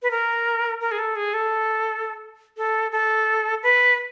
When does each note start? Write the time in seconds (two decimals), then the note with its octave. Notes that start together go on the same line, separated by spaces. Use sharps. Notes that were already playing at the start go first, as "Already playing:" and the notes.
0.02 B4
0.11 A#4
0.81 A#4
0.91 G#4
0.99 A4
1.16 G#4
1.34 A4
2.58 A4
2.92 A4
3.63 B4